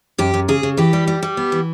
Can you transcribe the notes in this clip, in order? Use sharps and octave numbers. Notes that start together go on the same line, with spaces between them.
F#2 G4
F#2
C#3 G#4
C#3
E3 G4
G3
G3
G3
B3
E3